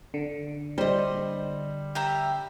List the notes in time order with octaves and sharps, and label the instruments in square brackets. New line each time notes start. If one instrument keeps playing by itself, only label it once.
[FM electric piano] D3
[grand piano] G3 [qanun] C5 D#5
[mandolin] G4 E5 A#5